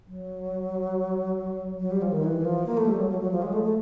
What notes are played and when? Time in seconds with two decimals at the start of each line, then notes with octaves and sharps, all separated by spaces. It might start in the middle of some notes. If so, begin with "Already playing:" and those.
0.07 F#3
1.80 F#3
1.91 G3
2.02 F3
2.12 D#3
2.23 E3
2.45 F3
2.66 A#3
2.77 A3
2.88 G3
2.99 F#3
3.10 F#3
3.20 F#3
3.31 F3
3.42 G#3
3.53 A3
3.64 A3